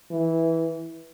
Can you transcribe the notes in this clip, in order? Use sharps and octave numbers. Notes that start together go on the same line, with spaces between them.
E3